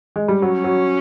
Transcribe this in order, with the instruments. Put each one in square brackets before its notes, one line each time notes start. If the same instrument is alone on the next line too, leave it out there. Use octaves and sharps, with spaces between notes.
[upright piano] G#3
G3
[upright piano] F#3 [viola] C#4
[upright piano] F#3